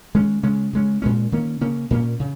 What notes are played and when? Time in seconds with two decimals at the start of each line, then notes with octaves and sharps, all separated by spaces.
0.15 D#3 G#3 C#4
0.43 C#3 G#3 C#4
0.73 C#3 G#3 C#4
1.02 A#2 G#3 C#4
1.32 D#3 A#3 C#4
1.61 C#3 A#3 C#4
1.90 A#2 A#3 C#4
2.20 C#3